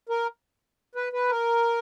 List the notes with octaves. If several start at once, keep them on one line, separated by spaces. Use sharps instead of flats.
A#4
B4
B4
A#4